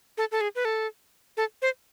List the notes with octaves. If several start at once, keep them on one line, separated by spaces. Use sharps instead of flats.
A4
A4
G#4
B4
A4
A4
C5